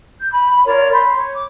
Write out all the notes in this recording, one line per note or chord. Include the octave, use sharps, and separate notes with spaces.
G6
B5
F4 A#4 C#5 D5
B5 C6 G6
C#5
D6